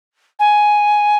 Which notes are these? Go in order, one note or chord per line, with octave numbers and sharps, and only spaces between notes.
G#5